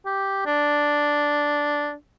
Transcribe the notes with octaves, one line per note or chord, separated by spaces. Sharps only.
G4
D4